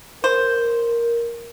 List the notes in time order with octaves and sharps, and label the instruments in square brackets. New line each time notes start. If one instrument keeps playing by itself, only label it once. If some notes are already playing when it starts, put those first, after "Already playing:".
[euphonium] A#4 [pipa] C5